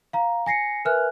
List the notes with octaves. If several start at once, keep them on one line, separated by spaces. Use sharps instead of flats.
F5 A#5
G#5 A#6 C7 C#7
A#4 B4 E5 G#5 F6 F#6